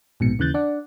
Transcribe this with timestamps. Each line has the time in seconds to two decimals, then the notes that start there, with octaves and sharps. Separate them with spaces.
0.20 A#1 G#2 B2 C#7
0.39 D#2 C#3 E3 F#6 G6 A6
0.54 D4 D5 F#5